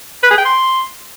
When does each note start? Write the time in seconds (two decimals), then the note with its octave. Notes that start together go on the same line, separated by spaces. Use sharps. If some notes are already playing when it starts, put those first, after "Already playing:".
0.23 B4
0.30 G#4
0.38 G5
0.45 C6